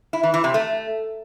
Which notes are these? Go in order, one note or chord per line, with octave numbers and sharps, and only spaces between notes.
E4
E3
E3
C3
A3